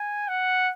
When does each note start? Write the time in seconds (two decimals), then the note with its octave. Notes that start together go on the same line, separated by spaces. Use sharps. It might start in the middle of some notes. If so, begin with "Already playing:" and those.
Already playing: G#5
0.28 F#5